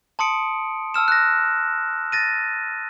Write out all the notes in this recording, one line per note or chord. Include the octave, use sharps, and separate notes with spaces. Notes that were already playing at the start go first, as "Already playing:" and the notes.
A5 C6 D#6 C#7 D7
A5 E6 F6 E7
F#6 A#6
A6 A#6 D#7